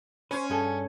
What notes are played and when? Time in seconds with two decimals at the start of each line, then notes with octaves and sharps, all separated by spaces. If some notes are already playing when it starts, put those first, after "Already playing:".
0.31 C#4 B4 C5
0.50 G2 G#4 A4